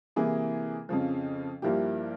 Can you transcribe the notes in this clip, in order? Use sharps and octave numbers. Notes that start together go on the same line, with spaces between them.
C3 E3 A#3 E4 G#4
F2 C#3 F3
G2 F3 A#3 E4 G4